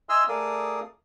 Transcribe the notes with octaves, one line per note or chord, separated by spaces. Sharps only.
D#5 E5 G#5 C6 E6 F6
A3 G#4 A#4 D5 F5 D#6